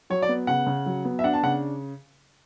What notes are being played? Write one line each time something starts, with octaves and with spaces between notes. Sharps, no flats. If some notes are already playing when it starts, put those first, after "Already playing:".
F#3 C#5
D5
B3
C#3 F#5
C#3
F#3
B3
E5
D4 F#5
A5
C#3 F#5